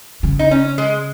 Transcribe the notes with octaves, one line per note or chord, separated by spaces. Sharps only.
C#3
D#4
C#4
G#3